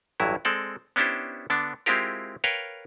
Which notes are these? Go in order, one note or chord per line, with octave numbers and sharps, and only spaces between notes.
A1 G2 F#3 E4
G#3 C4 A4 D5
B3 C#4 D4 E4 G4 C5
D3 B3 D4
G#3 C4 E4 F4 G4 A#4
A#4 B4 C#5 F5 G5